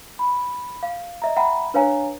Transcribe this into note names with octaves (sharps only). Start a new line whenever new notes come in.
B5
F5
D#5 E5 A#5
E5 F#5 G5 A#5 B5
D4 B4 C#5 F5 G#5 A#5